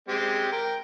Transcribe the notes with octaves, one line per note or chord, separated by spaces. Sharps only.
G#3 C4 G4
A#4 G5